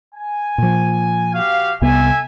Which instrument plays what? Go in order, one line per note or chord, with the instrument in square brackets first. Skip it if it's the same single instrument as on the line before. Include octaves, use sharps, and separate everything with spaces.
[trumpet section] G#5
[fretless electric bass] A#2 F3
[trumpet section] F#4 G4 F5
[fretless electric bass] C2 C3 B3 [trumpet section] A4 E5 G#5